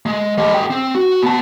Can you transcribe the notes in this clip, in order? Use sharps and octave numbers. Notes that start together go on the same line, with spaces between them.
G#3
G3 D#5
G#4 G5
C4
F#4
B3 A5